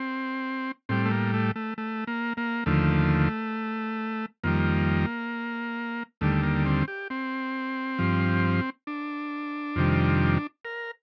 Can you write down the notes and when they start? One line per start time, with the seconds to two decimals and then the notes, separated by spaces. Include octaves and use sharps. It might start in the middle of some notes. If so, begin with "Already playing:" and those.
Already playing: C4
0.89 A2 G3 C4
1.05 A3
1.11 A#3
1.34 A3
1.56 A3
1.78 A3
2.07 A#3
2.37 A#3
2.66 D#2 D3 F3 A3
4.44 F2 D#3 G3 A#3
6.21 D#2 D3 G3 A3
6.43 A#3
6.65 C4
6.88 G4
7.10 C4
7.99 G2 F3
8.87 D4
9.76 F2 C3 D#3 G3
10.65 A#4